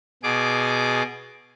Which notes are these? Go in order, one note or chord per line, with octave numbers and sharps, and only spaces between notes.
B2 G#4 D6